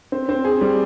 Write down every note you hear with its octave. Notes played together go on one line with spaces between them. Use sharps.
C4
C4
G#4
G3